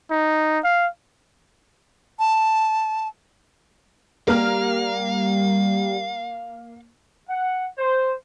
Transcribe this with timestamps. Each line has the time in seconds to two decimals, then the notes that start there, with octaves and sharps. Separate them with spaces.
0.11 D#4
0.64 F5
2.19 A5
4.28 G3 A#3 F5 F6
7.29 F#5
7.79 C5